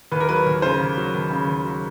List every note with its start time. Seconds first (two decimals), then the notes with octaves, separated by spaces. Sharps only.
0.12 D#2 B4
0.20 A#4
0.29 F#3 B4
0.47 D#2
0.62 C#3 C5
0.80 D#2
0.97 F#3
1.14 D#2
1.30 C#3
1.47 D#2
1.64 F#3